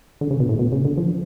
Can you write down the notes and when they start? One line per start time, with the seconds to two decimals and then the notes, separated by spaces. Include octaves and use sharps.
0.21 D3
0.31 C#3
0.40 B2
0.49 A2
0.59 B2
0.72 C#3
0.85 D3
0.97 F3